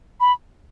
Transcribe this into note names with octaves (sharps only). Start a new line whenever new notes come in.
B5